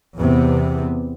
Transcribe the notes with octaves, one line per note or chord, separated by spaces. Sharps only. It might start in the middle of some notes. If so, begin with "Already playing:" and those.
E2 C3 B3